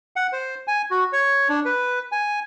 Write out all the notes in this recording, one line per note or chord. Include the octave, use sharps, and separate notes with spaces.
F#5
C5
G#5
F#4
C#5
D4
B4
G#5